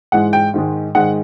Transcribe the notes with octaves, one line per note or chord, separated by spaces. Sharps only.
G#2 E3 G#3 F#5
G5
G#2 D#3 G#3
G#2 D#3 G#3 F#5